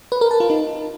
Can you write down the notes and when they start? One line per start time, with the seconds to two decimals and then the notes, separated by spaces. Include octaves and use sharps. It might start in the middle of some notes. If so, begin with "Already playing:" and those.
0.12 B4
0.21 A#4
0.31 A5
0.40 F4
0.50 D#4